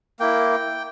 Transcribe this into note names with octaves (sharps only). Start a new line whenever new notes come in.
A#3 E4 G5